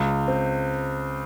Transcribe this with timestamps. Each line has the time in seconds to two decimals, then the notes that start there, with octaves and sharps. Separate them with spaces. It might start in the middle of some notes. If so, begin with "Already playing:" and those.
Already playing: C#2
0.28 C4